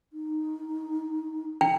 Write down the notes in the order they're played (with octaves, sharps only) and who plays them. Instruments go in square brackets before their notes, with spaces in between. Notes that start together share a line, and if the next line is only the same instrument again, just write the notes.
[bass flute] D#4
[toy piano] G5